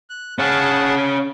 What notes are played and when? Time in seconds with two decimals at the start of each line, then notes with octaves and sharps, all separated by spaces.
0.10 F#6
0.39 C#4 G#4 F5 F#5 A5